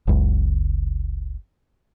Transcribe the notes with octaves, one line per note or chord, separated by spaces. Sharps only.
F#1 C#2